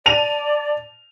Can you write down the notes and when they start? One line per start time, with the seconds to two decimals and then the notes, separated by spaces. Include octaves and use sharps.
0.06 D5 A5 D#7 F7